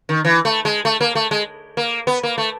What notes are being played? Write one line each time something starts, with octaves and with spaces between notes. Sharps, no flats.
D#3
E3
A3
G#3
A3
A#3
A3
G#3
A#3
B3
A#3
A3